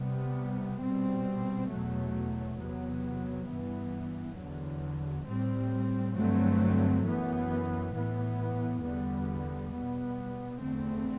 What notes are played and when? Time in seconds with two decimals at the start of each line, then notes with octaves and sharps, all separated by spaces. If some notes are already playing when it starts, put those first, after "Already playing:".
Already playing: C3 G3 B3
0.81 B2 G3 C4
1.70 E2 B2 F#3 A3
2.59 E2 C3 F#3 B3
3.49 G2 E3 B3
4.37 E2 D3 F#3
5.27 A2 G3 C4
6.16 G2 D3 F#3 A3 C4
7.05 F#2 E3 B3
7.94 A2 E3 B3
8.83 E2 D3 G3 B3
9.72 B2 G3 B3
10.61 E2 D3 A3 C4